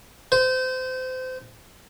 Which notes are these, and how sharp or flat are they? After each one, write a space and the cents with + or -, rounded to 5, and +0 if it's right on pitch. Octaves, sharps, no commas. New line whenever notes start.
C5 -30